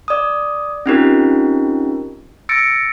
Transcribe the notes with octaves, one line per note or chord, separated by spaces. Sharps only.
D5 D#6
C4 C#4 D#4 F4 G4 A#4
E6 A6 A#6 C#7 D7